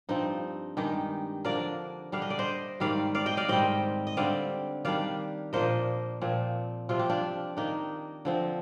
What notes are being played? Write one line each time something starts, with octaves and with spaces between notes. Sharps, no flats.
G2 F3 C4 D#4
G2 D#3 G#3 D#4 G4
D3 F3 A#3 D4 A#4 D5
D3 G3 D4 F5
D#5
D5
C5 D#5
G#2 D#3 G3 C4 D5 F5
D5 F5
D#5 G5
D5 F5
G#2 D#3 G3 C4 D#5 G5
D#5
D3 G3 C4 D5 F5
D#3 G3 D4 D5 F5
A#2 F3 A#3 D4 C5 D#5
A#2 F3 C4
C3 F3 C4 F4
G4
D4 F4
D#3 A#3 D4 D#4
D3 F3 C4